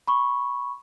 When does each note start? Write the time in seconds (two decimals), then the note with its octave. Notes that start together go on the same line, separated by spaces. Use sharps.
0.07 B5 C#6